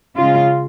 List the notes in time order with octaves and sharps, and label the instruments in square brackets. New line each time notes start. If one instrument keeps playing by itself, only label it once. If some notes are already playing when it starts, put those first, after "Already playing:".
[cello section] C#3 G#3 F4